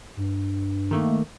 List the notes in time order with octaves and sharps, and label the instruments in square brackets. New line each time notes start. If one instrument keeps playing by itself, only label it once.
[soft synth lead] G2
[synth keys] D#3 A3 A#3